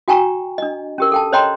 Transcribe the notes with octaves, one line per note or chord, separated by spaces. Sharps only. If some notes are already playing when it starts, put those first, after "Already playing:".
F#4 G5 G#5 A#5 C#6
D4 D#5
C#4 G4 A#4
A4 G5 A5
C5 C#5 D#5 G5 A#5 C6